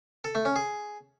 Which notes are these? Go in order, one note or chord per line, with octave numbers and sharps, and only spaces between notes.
A4
A3
C#4
G#4